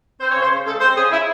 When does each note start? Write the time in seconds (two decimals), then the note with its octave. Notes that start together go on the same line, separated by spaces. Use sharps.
0.20 C4 C5
0.30 C#5
0.35 C#3
0.41 C5
0.50 C#3
0.66 G#3 A4
0.80 C4 C5
0.96 C#3 G#4
1.11 E4